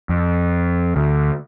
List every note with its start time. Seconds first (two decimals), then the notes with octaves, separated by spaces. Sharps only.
0.09 F2
0.96 D2